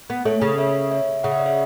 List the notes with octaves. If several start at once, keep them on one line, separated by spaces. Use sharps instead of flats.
B3
A3 A4 C#5
C#3
C#5 E5
C#5 E5
C#3 F#5
E5
D5
C#5 E5